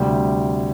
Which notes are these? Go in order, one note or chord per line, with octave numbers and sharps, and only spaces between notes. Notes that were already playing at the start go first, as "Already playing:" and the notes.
Already playing: D2 C3 G3